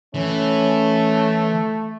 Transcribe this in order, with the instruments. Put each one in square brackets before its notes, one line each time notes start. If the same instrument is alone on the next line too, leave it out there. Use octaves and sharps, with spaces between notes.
[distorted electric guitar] E3 [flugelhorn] A3 [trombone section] C#4